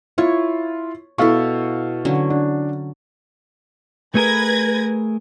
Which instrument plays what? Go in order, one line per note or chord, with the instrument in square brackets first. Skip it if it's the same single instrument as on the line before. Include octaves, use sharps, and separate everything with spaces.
[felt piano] E4 F4 [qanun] C#5
[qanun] B2 E4 [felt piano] A4 F5 C#6
[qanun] D3 F#3 C#4
[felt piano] D4
[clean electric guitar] A3 G#4 A#4 [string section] B4 G#6 A#6